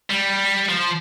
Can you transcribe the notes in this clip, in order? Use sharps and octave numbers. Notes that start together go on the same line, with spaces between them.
G3
F3